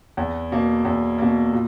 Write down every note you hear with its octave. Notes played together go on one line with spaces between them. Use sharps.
E2
B2 A#3
E2
B2 A#3
A#2